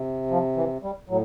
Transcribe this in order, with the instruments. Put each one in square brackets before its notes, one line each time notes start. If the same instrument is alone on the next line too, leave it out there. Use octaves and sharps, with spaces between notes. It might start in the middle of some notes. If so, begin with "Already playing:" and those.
Already playing: [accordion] C3
F3
E3
G3
A2 F#3